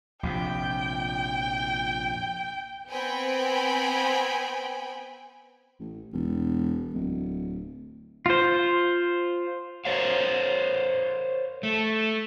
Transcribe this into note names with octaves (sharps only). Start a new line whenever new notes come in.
A#1 F2 C3 G5
B3 C4 G5 G#5 B5
A1
E1
D1
F4 C5
A#4 C5 C#5 F5
A3